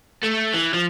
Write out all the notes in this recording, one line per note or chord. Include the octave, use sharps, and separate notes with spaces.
A3
E3
F3